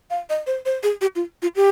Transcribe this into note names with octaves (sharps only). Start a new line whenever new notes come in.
F5
D#5
C5
C5
G#4
G4
F4
F4
G4